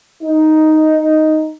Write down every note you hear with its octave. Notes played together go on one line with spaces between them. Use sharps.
D#4